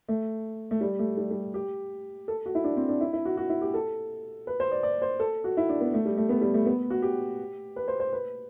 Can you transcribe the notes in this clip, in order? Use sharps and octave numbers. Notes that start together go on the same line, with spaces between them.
A3
A3
G3
A3
G3
G3
G4
A4
F#4
E4
D4
C4
D4
E4
E4
F#4
F#4
E4
G4
A4
B4
C5
D5
D5
C5
A4
F#4
E4
D4
B3
A3
G3
A3
B3
G3
A3
B3
F#4
G4
B4
C5
C5
B4